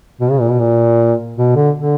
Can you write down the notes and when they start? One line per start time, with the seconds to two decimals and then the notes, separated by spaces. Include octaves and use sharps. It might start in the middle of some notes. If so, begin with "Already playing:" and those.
0.21 B2
0.30 C#3
0.40 A#2
0.50 B2
0.60 A#2
1.38 B2
1.56 D3
1.76 D3